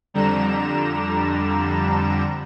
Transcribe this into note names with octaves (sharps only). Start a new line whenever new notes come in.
F2 D3 G3 A#5 E7